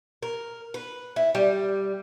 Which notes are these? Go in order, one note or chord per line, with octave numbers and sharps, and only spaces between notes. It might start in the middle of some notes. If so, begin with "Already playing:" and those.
A#4
B4
E4
G3